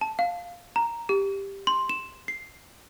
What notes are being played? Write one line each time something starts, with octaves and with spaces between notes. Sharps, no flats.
A5
F5
A#5
G4
C6
E7
C7